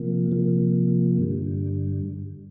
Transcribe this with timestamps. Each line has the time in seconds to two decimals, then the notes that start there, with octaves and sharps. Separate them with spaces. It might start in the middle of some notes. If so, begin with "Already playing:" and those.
Already playing: C3 F3 A#3
0.31 C3 F3 A#3
1.18 G2 D3 G3